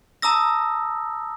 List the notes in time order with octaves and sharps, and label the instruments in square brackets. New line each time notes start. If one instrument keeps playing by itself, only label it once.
[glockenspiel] A5 A#5 D#6 E6 A#6